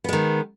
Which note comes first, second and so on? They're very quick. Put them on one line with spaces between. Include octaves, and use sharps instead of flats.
B3 G#3 D#3